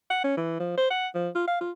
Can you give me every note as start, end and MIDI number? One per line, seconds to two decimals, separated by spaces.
0.10 0.20 78
0.24 0.36 61
0.37 0.58 52
0.60 0.75 53
0.77 0.90 72
0.90 1.08 78
1.15 1.29 53
1.35 1.43 65
1.48 1.57 77
1.61 1.71 65